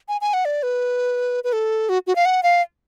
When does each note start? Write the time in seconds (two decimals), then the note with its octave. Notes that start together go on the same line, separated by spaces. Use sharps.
0.08 G#5
0.21 G#5
0.34 F#5
0.45 D5
0.63 B4
1.44 B4
1.53 A4
1.89 F#4
2.07 F#4
2.16 F5
2.25 F#5
2.43 F5